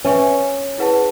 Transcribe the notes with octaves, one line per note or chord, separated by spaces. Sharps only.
C#4 B4 E5 G#5 C#6
E4 G#4 B4 F#5 A5